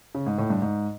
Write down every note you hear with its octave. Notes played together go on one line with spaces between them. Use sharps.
C#3
G#2
A2
G2
G#2